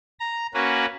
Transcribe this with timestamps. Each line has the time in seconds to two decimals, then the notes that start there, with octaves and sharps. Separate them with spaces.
0.20 A#5
0.54 A#3 C#4 F#4 B4